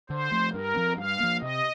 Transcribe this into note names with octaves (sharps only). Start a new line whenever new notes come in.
D3 C5
F3 A3
G2 A#4
F3 C4
G2 F5
F3 A#3
C3 D#5